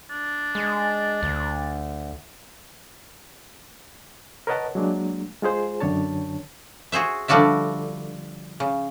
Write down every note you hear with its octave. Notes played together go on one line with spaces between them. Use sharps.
D4
G#3
D2
A#4 B4 C#5 D#5 F#5 A5
F#3 G#3 A#3 D4
G#3 F4 G#4 C5
F#2 D3 D4 C#5 A5
F#4 G#4 C5 E5
D3 F3 G3 F#4 D5 E5
C#3